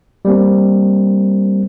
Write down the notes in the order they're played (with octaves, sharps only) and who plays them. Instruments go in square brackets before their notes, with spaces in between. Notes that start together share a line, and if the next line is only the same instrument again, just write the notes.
[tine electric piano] G3 A#3 C4